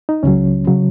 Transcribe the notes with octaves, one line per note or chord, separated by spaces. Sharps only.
D#4
C#2 C#3 F#3 C#4
C#3 F#3